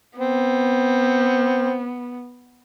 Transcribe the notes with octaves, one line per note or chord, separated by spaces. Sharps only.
B3 C4